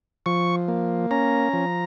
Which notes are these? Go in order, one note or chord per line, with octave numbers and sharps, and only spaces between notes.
F3 C#6
A#3
C#4 A#5
F3